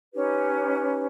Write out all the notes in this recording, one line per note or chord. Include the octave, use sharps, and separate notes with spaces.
C#4 D#4 G4 B4